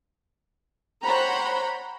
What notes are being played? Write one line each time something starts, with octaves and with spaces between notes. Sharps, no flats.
C5 C#5 F#5 G5 A#5 B5